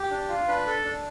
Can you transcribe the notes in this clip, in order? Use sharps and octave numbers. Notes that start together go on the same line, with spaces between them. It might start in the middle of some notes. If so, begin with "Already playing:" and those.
Already playing: G4
D4
F4
D4 B4
A4
D4